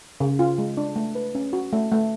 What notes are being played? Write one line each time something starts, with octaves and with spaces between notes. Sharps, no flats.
C#3
F4
G#3
D4
A3
B4
C#4
F#4
A3
A3